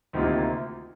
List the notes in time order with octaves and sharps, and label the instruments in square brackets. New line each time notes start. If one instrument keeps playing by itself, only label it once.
[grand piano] D2 C3 D#3 A#3 F4